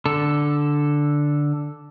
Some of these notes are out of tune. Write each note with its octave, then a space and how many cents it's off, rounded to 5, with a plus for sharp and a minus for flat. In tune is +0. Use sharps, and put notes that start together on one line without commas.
D3 +0 A4 +0